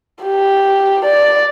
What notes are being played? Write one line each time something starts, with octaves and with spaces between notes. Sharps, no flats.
G4
D5